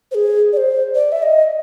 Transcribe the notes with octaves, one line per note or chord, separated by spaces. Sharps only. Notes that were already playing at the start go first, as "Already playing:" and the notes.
C5
G#4
D5
C5
D5
E5
D#5